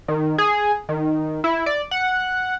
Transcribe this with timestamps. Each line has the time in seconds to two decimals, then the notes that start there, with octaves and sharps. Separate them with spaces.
0.08 D#3
0.38 G#4
0.89 D#3
1.44 E4
1.66 D5
1.91 F#5